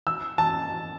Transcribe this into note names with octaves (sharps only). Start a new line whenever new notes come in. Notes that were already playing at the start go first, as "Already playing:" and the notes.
E6
A5